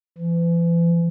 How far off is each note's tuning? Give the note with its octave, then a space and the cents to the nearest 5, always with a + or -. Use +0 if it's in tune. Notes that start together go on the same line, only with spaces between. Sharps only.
E3 +40